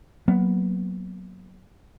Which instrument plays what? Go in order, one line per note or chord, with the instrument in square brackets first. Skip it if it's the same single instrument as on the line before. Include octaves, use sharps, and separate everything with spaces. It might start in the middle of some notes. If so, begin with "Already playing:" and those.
[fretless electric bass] F#3 A#3 B3